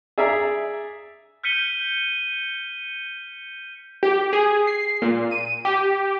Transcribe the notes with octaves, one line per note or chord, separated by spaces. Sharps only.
G#4 D5 E5 A#5
F6 G6 B6 C#7 D#7 G7
G4
G#4
C7
A#2
D#7
G4